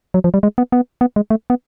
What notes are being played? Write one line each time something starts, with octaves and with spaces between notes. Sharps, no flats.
F#3
F3
G3
G#3
B3
B3
B3
G#3
A3
B3